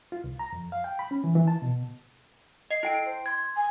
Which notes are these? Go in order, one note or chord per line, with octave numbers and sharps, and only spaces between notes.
F4
C2
A#5
F2
F5
G5
B5
C#4
E3
E3
A5
B2
D#5 C7
E4 A4 G5 D7
C5
C6 G#6
G#5